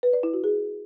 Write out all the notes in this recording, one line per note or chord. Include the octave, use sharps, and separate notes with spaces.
B4
D5
E4
F#4
G#4